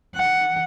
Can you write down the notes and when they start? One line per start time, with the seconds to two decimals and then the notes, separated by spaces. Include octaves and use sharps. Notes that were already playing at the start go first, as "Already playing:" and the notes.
0.15 F#5